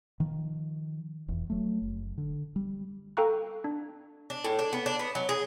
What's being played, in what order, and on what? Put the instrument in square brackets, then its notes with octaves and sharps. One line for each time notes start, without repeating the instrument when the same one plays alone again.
[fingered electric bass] D#3 F3
F1 E2
F#3 A3
F#1
D3
G3
[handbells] A4 F5 G5 A#5 C#6 F#6
D4
[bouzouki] D4
A2
D4
B3
D4
B3
F#3
G#4